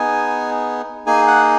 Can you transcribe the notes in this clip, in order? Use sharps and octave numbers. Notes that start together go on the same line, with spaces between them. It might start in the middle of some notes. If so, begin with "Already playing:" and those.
Already playing: B3 D#4 G#4 G#5
A#3 D#4 G#4 G#5
F#5